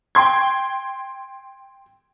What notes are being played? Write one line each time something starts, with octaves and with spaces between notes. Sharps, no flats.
G5 C6 G#6